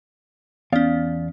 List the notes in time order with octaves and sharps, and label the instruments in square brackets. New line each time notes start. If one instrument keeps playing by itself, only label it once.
[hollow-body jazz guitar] E2 D5 F5 [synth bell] B3 C#4